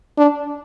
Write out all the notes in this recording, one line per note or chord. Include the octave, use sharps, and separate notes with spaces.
D4